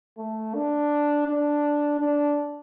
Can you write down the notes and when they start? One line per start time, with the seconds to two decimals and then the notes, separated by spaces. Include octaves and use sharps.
0.18 A3
0.55 D4
1.28 D4
2.00 D4